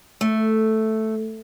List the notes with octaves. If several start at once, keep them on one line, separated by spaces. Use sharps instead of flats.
A3